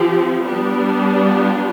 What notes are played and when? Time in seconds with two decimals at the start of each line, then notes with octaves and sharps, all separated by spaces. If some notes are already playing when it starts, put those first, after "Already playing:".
Already playing: F3 C4 G4
0.44 G3 B3 D4
1.25 F4